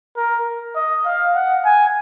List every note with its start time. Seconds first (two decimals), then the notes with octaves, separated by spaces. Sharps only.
0.17 A#4
0.75 D#5
1.05 F5
1.35 F#5
1.65 G#5